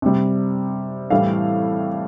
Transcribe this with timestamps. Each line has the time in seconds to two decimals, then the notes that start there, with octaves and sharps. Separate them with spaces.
0.02 C3 G3
1.10 A2 E3 G3 F5